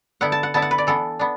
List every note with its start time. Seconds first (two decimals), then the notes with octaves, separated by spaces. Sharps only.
0.21 D3 B3 E4 F#5
0.32 A5
0.43 F#5
0.54 D3 B3 E4 A5
0.62 F#5
0.71 B4
0.78 D5
0.87 E3 B3 D4 A4
1.19 B3 D4